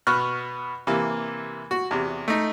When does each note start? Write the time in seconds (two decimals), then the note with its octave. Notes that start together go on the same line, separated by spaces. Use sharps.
0.07 B2 B3 C#6 F6 F#6
0.87 C3 E3 A#3
1.71 F#4
1.91 E2 C3
2.28 A3 D#4